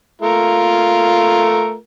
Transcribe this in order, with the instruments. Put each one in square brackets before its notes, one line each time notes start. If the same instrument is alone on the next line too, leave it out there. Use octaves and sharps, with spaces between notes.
[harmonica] A3 F4 A#4